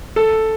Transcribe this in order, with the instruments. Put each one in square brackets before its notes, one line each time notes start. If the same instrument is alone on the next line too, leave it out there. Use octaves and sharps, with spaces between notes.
[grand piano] A4